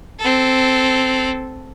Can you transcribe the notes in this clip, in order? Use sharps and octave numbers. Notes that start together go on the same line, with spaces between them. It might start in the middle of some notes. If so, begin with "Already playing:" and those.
C4 A4